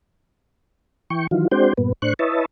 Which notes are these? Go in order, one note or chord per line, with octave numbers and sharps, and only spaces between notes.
E3 G5 C#6
D#3 E3 F#3 F4
G#3 C4 D4 F#4 C5 G5
G2 A#2 B3
A2 D4 C5 C#6 F#6
E4 B4 C#5 D#5 E5 A5